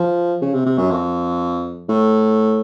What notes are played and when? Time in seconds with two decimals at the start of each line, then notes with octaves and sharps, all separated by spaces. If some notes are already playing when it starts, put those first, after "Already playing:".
Already playing: F3
0.42 C#3
0.54 C3
0.66 C3
0.78 F#2
0.91 F2
1.89 A2